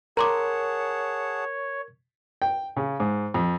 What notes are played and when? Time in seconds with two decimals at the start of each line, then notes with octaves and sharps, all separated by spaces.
0.17 G#4 A#4 C#5 F#5 A5 A#5 C6 D6
2.42 G5
2.77 C#3
3.00 G#2
3.34 F2